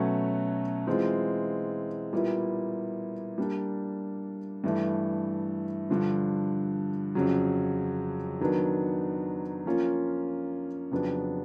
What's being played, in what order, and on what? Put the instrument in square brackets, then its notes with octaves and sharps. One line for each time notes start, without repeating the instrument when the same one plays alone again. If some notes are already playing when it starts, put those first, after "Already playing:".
Already playing: [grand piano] B2 F#3 A3 C#4 F#4
E3 G#3 C4 F4
A#2 G3 B3 E4
G3 A#3 D4
G2 E3 A3
G2 D3 F3
F2 C#3 F#3
D#3 F#3 B3 D4
F3 A#3 C#4 F4
F2 C#3 F#3 B3 D4